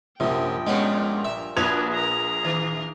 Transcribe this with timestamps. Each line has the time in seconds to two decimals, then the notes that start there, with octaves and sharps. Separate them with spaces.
0.20 A#1 F#2 C3 G5
0.67 G2 A#2 G#3 B3 C#4
1.25 E5
1.57 A#1 A#3 D4 F#4 B4 G#6 F7
1.93 G#4 A#5
2.44 D#3